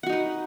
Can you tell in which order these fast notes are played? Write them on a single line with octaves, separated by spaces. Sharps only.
F#5 F#4 D#4 B4